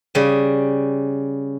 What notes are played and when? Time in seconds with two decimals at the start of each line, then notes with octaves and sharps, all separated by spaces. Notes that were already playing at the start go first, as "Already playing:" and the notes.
0.15 C#3 G3